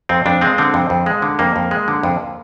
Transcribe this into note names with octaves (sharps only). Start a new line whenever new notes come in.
F2 C4
F2 D4
G#3 C4
D3 C4
F2
F2
G#3
D3
F2 A#3
F2
G#3
D3
F2